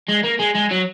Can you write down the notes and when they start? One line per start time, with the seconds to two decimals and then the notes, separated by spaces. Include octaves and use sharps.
0.09 G#3
0.24 A#3
0.40 G#3
0.55 G#3
0.71 F#3